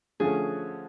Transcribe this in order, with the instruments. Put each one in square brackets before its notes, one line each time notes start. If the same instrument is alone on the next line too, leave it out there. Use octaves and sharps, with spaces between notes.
[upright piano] D3 F3 A3 C#4 [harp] G#4